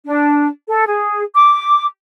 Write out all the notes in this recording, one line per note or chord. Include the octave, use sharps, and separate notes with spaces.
D4
A4
G#4
D6